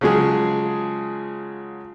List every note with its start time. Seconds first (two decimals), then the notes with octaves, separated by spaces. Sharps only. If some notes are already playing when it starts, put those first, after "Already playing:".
0.01 C#3 F3 F#3 G#3 G#4